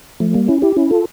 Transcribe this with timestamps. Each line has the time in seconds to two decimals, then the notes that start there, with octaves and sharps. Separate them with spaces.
0.20 F3 A3
0.34 G3 A#3
0.48 C#4 E4
0.62 E4 G4
0.76 C#4 E4
0.90 F4 A4